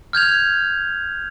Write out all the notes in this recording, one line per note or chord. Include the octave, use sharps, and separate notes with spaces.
F6 G6 G#6 F7